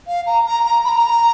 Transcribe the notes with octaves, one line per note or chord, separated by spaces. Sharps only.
F5
A#5
A#5
A#5
B5
A#5